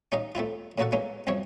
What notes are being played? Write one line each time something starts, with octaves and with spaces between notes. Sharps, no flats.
C#4 D#4 G4 D#5 F5
A3 C4 E4 F4
A2 C#3 A#3 F#4 A4 F#5
E3 G#3 A#3 C#4
C2 F#2 F3 C4 C#5